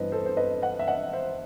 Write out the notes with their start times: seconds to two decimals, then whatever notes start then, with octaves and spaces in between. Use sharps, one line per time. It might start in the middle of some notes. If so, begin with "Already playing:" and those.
Already playing: G2 E3 B4 C5 D#5
0.12 A4 C5
0.26 C5
0.37 B4 D#5
0.62 D#5 F#5
0.79 E5
0.88 D#5 F#5
1.13 C5 E5